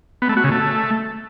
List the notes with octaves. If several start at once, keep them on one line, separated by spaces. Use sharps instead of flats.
B3
A3
F#4
C#3
A3